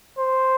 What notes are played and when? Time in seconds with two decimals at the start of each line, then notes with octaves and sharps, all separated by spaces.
0.18 C5